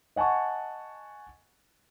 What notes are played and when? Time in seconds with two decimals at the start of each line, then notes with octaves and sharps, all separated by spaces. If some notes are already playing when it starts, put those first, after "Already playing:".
0.16 D#5 F#5 G#5 A5 C#6